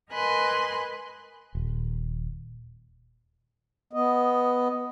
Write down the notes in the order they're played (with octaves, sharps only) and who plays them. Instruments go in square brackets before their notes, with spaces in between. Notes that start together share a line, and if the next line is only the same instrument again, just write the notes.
[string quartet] A#4 B4 D#5 G#5 C6 F#6
[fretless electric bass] D#1
[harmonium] B3 D#5